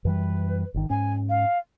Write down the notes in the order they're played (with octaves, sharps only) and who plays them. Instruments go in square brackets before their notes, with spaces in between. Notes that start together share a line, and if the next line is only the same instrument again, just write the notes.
[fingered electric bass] F#2 E3 G3 [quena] B4
[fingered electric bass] G1 D#3
[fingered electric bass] G#2 C#4 [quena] G#5
[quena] F5